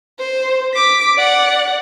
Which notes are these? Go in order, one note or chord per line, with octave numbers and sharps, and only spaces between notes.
C5
D6 B6
D5 F#5